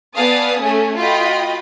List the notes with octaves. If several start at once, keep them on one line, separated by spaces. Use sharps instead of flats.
B3 D5 F5 G#5 A5 D#6
A3 C#4 G#4
F4 F#4 D#5 G5 B5